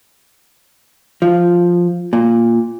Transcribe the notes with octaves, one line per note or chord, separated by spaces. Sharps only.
F3
A#2